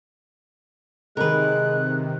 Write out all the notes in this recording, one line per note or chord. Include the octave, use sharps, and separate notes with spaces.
C3 D#3 G#3 A#4 B4 F#6